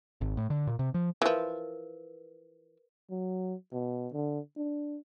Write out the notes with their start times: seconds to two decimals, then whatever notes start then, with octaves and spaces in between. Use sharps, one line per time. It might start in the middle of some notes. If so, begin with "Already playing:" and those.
0.21 G#1
0.37 A2
0.50 D3
0.67 A#2
0.79 C3
0.94 F3
1.22 E3 F3 A#4 B4
3.10 F#3
3.73 B2
4.13 D3
4.57 D4